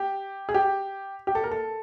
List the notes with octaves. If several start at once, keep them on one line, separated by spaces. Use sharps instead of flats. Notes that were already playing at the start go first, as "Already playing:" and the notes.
Already playing: G4
G#4
G4
G4
A4
A#4
A4